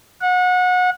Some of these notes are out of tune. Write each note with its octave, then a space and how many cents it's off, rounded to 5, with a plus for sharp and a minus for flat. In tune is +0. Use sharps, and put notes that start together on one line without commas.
F#5 -30